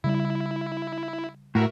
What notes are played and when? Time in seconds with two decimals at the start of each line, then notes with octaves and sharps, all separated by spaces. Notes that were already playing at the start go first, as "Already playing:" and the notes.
0.04 C#3 G3 E4
1.55 A2 F#4 A#4 E5